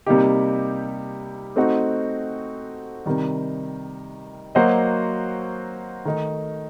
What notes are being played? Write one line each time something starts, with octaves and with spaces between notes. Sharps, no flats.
C3 G3 A#3 D#4 G4
A3 C4 D#4 F#4
C3 D#3 G3
F#3 A#3 F#4 C5 D#5
D#3 A3 D#4